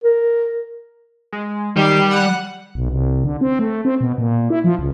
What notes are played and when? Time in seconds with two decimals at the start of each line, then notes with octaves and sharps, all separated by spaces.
0.04 A#4
1.33 G#3
1.77 D#3 G3 G4 C7
2.11 F#5 F#6
2.75 B1
2.90 C2
3.24 D3
3.41 C4
3.59 A3
3.85 C4
4.01 B2
4.18 A#2
4.50 E4
4.64 F3
4.79 C#2